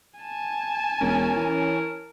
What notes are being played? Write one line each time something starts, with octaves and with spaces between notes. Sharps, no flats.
G#5 A5
E1 C#4 A#4
E3